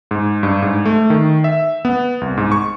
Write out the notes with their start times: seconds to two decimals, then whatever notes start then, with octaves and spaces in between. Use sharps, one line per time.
0.11 G#2
0.43 G2
0.62 G#2
0.86 A3
1.10 D#3
1.44 E5
1.85 B3
2.21 C2
2.37 G#2
2.52 C#6